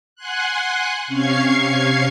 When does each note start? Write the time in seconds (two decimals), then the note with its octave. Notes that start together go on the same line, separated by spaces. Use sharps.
0.15 F#5 G#5 C6 F#6
1.07 C3 C#4 F5 C#6 G#6 C7